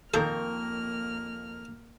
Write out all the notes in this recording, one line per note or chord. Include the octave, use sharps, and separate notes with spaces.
F2 D#3 A#3 A4 A#4 F6